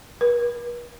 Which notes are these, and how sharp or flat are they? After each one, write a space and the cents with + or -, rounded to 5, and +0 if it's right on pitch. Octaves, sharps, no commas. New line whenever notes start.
B4 -45